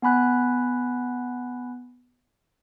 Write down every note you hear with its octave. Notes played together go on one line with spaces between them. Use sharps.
B3 G#5 B5 F#6